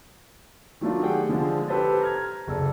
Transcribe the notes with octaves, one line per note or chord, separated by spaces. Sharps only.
D#3 F#3 A3 D4 F4
G4 G#4 F#5 G5
D3 F3 G#3
G4 A4 B4 C5 A5
A#5 F6 G#6
F#1 A4 D5